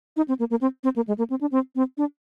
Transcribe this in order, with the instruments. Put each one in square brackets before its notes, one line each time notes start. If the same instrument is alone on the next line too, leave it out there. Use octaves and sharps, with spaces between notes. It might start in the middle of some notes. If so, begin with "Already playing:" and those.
[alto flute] D#4
C4
A#3
A#3
C4
C4
A#3
G#3
A#3
C4
D4
C4
C4
D4